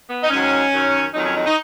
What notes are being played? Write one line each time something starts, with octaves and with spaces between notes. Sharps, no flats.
B3
D#4
G#2 D#3 F#3 C#4
F#2 D#3 F#3
F2 D#3 F#3 D#4
C#4
D#4
D#4